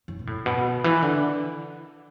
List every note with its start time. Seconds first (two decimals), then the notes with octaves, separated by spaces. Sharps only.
0.08 F#2
0.19 B2
0.27 A2
0.46 B2
0.65 D3
0.84 E3
1.02 D3